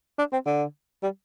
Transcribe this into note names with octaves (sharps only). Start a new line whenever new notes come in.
D4
C4
D3
G3